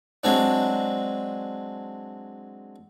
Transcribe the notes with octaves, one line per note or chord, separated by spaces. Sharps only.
F#3 G#3 C4 D4